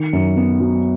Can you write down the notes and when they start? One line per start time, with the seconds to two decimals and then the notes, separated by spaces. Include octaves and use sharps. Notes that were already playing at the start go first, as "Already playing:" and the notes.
Already playing: D#3 C#7
0.13 F#2
0.37 B3
0.60 F#3